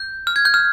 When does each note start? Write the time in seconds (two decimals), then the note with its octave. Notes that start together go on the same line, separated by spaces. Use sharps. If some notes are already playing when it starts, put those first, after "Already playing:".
Already playing: G6
0.27 F6
0.36 G#6
0.45 G6
0.54 F6